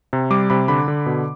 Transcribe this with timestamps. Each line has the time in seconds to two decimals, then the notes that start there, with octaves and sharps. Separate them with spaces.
0.13 C3
0.30 G3 D6
0.50 C3 B5
0.68 D3 B5
0.88 D3
1.06 B2